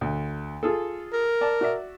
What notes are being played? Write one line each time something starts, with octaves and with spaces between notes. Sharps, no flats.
D2
F4 G#4 A4
A#4
D5 A5
F#4 D5 E5